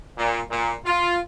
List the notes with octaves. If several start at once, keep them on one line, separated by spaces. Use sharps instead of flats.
A#2
A#2
F4